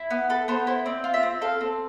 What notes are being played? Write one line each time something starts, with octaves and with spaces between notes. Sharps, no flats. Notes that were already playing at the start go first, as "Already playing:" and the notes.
Already playing: E4
B3
A4 B4
B3 C5
E4 C5
C4 D5
F4
E5
C4
A4 F5
C4